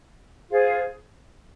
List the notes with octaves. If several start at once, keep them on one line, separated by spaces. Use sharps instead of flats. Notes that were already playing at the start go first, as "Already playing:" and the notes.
F4 G#4 C5